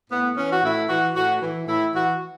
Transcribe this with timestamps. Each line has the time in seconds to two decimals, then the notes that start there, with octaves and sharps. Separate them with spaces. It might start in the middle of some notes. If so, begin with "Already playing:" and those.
0.10 A2 B3
0.37 E3 C#4
0.52 F#4
0.63 A2 E4
0.89 E3 F#4
1.15 A2 F#4
1.41 E3
1.67 A2 E4
1.94 E3 F#4